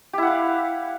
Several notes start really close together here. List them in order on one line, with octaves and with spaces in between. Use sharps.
G4 E4 F#5 F5